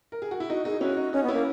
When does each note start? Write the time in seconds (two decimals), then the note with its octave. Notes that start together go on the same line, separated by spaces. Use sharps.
0.12 A#4
0.22 G#4
0.31 F#4
0.40 E4
0.50 D#4 F#4
0.65 D#4 G#4
0.81 C#4 E4 F#4
0.97 D#4
1.13 C#4 D#4
1.23 B3
1.28 C#4 E4
1.34 A#3